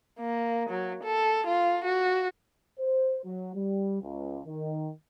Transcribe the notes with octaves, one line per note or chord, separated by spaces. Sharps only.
A#3
F#3
A4
F4
F#4
C5
F#3
G3
C#2
D#3